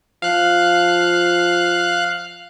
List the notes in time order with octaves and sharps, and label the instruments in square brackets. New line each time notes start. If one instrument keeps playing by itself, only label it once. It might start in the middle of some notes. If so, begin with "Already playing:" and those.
[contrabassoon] F3 [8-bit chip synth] F5 F#6